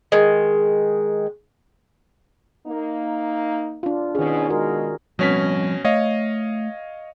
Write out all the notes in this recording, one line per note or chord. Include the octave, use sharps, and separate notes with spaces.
D#3 G#3
A#3 D#4
D4 F4
B2 D#3 C#4 G#4
B2 G#3 F#4 A#4
B2 F3 G3 C4 C#4 B6
A3 C#5 D#5 F5